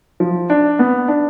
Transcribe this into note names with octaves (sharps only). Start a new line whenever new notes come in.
F3
D4
B3
D4